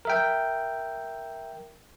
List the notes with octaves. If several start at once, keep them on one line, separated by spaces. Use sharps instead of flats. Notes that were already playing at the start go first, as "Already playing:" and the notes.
A#4 E5 G5